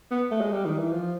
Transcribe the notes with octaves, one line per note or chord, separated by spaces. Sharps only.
B3
A3
G#3
G3
D#3
E3
F3